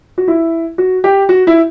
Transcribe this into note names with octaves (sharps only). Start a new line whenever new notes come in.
F#4
E4
F#4
G4
F#4
E4